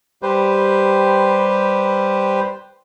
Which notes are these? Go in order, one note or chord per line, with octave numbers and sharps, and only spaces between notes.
G3 G4 B4 C5